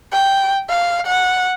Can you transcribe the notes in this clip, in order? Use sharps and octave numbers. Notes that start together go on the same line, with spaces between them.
G5
F5
F#5